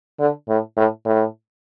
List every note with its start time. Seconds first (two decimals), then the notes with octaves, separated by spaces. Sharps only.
0.19 D3
0.48 A2
0.76 A2
1.05 A2